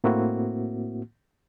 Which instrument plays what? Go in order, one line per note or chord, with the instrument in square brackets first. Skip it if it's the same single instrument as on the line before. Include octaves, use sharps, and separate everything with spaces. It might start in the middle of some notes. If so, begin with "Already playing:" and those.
[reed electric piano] A2 A#3 C4 E4 F#4